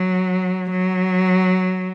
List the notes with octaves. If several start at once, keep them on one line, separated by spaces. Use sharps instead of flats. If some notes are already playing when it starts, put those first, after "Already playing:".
Already playing: F#3
F#3